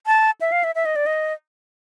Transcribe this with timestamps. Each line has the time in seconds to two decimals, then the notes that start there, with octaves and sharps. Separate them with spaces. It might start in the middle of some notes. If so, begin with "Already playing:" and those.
0.07 A5
0.41 E5
0.52 F5
0.64 E5
0.75 E5
0.85 D#5
0.96 D5
1.06 D#5